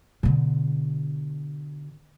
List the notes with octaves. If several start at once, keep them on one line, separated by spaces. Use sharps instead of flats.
B2 D3